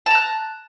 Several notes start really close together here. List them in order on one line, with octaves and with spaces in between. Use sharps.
A5 A#5 F#6